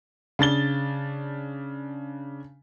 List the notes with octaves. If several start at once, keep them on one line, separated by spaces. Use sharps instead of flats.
C#3 D4 A6 G7